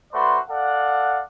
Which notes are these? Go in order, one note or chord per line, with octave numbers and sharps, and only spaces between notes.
A3 F#4 B4 C5 D5 C6
A4 D5 F5 F#5